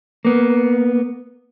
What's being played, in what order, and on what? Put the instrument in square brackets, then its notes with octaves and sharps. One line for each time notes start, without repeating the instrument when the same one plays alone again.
[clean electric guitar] A#3 B3